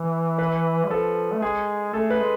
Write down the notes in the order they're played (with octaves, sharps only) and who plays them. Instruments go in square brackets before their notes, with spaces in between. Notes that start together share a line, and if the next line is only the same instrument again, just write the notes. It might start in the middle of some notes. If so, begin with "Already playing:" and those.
Already playing: [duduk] E3
[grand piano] B4
[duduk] G#3
[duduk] F3 [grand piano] A4
[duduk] A3
[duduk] G#3 [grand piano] G#4
[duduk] A3 [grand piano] A4
[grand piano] B4
[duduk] G#3